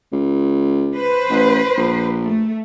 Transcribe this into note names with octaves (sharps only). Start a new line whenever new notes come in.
C#2
B4 C5
A1
A#1
A3